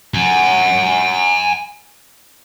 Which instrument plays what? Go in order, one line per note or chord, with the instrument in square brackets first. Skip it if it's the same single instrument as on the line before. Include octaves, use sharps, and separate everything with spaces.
[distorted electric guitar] F#5 G#5